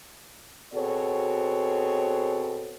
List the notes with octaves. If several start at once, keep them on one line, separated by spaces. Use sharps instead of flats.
B2 C4 F#4 G#4 A4 C#5